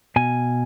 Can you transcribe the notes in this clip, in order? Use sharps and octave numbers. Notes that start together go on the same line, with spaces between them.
B2 G#5